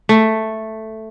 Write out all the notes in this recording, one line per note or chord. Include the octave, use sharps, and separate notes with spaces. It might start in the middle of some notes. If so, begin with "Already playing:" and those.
A3